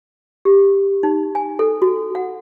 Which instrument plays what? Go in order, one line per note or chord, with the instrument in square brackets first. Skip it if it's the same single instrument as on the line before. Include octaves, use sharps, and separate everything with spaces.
[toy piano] G4
D#4
G#5
A4
F#4
F#5